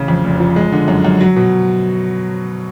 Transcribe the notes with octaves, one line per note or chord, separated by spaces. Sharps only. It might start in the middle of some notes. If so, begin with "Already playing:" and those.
Already playing: A1 C#3
F2
F1
F3
G#3
D3
F#2
F#2
F#3
B2